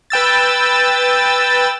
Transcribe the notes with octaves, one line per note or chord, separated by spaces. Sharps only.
B4 G5 E6 A6